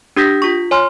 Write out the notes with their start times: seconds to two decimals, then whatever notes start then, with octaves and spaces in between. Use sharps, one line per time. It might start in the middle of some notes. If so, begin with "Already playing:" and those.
0.16 D4 G4 D#6 G6 A#6 B6
0.42 F4 C#6
0.71 C#5 G#5 C6 F6